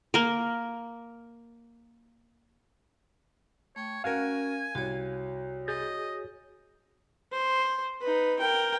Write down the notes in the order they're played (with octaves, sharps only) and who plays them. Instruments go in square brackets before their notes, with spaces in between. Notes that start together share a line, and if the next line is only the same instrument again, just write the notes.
[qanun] A#3 A#4
[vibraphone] A3 G5 [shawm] C#5
[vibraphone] C#4 [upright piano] F#4 A#4 [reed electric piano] F5 [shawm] G#5
[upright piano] C2 [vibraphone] F#4 C#5
[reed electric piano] G#4 G6 A6 [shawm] D#5
[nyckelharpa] C5
D#4 B4
A#4 G5